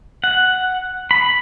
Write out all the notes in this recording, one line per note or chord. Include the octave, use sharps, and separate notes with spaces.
F#5
B5